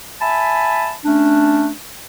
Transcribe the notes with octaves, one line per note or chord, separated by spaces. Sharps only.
E5 G#5 A5 B5
A3 C#4 D4